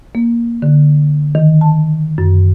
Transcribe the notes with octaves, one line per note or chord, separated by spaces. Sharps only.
A#3
D3
D#3
A5
F#2